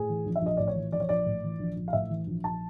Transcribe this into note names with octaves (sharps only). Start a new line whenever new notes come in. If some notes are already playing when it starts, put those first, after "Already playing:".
Already playing: A2 G#4
E3
A#1
E5
A#1 D#5
A2 D5
C#5
E3
A#1 D5
C#5
A#1 D5
A2
E3
A#1
A#1
F5
A2 E5
E3
A#1
A#1 A5